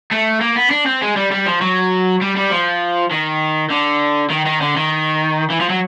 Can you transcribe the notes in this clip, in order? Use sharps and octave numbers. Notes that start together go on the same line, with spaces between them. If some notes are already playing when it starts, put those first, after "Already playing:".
A3
A#3
B3
D4
C4
G#3
G3
G3
F3
F#3
G3
G3
F3
D#3
D3
D#3
D#3
D3
D#3
E3
F3
F#3